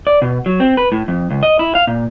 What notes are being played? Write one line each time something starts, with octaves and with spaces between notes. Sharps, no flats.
D5
B2
F#3
C4
B4
A2
F2
C#2
D#5
E4
F5
A#2